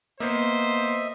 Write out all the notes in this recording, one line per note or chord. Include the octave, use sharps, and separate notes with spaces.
A#3 B3 C5 D#5 E5